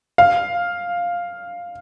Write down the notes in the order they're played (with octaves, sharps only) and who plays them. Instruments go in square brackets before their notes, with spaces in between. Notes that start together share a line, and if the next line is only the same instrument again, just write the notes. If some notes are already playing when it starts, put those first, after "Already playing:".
[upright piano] F5